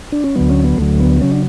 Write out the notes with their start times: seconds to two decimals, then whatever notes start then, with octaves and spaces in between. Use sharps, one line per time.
0.12 D4
0.24 C#4
0.36 D2 D3 F#3 B3
0.50 C#4
0.64 B3
0.78 D2 D3 F#3 A3
1.00 B3
1.21 C#3 F#3 C#4
1.32 D4